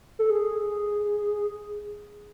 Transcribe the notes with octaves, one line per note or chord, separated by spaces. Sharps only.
A4
G#4